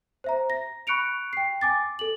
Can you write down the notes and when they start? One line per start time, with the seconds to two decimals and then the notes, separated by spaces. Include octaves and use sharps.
0.24 C5 E5 A#5
0.50 A#6
0.87 B5 C#6 F#6 C#7 D7 F7
1.33 G5 C7
1.61 G#5 D6 A6
1.99 A4 F#7